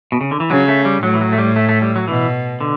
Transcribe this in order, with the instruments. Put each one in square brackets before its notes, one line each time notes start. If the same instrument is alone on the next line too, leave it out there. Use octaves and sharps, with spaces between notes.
[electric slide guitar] B2
C#3
D3
E3
[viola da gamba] C#3 [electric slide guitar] F#3
[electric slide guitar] A3
G3
[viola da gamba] A2 [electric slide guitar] F#3
[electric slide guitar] E3
F#3
A3
G3
A3
A3
G3
F#3
[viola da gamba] B2 [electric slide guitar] E3
[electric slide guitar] D3